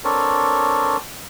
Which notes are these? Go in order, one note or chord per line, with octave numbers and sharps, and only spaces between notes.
C4 D4 A4 A#4 C#5